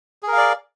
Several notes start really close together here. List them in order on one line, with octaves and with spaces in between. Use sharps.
G#4 A#4 F5 D5